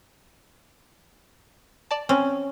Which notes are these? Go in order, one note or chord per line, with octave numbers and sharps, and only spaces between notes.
D5 A5
C4 C#4